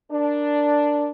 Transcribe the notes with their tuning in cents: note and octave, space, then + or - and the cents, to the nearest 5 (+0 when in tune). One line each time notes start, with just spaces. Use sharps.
D4 +0 A#4 +0